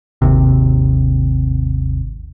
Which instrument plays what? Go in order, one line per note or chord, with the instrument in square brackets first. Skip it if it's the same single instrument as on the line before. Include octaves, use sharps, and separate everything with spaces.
[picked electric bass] G#1 D#2 C3